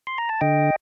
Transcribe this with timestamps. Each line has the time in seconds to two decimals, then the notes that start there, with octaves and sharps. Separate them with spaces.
0.07 C6
0.18 A#5
0.29 A5
0.41 D3 D#5 G5